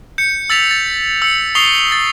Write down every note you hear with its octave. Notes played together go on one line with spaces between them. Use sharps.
G6 C#7
E6 A6 B6 F7
A6
E6 C#7
C#6 D#6 C7 F7 G7
A6